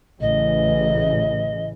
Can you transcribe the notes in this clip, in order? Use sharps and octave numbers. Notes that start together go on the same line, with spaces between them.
A1 C#3 E3 D#5